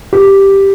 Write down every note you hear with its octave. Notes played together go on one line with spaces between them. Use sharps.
G4